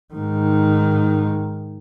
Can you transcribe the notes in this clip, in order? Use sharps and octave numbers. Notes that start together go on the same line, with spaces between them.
G#2 D#3